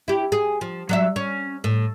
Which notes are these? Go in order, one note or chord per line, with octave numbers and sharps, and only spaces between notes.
E4 G4
G#4
F3
F#3 D5 E5
C#4
A2